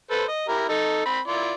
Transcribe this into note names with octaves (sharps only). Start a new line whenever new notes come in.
A4 B4 C5
D#5
E4 G4 A#4
D#4 A4
C4 B5
E4 F4 D5